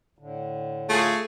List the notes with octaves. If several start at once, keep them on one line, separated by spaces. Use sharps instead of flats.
A2 D3
A3 F4 G#4